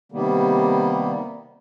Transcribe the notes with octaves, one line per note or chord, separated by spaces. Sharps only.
C3 D#3 G3 A#3 B3